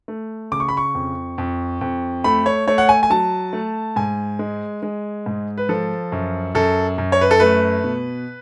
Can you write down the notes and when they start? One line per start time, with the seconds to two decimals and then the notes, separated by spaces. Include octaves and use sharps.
0.08 A3
0.52 C#3 D6
0.60 C#6
0.69 B5
0.77 C#6
0.95 F2
1.38 F2
1.81 F2
2.24 A3 B5
2.46 C#5
2.67 A3 C#5
2.78 F#5
2.89 G#5
3.03 G#5
3.10 F#3 A5
3.53 A3
3.96 G#2 G#5
4.39 G#3
4.83 G#3
5.26 G#2
5.58 B4
5.69 F3 A4
6.12 F#2
6.55 F#2 A4
6.98 F#2
7.12 C#5
7.21 B4
7.31 A4
7.40 A3 B4
7.84 B2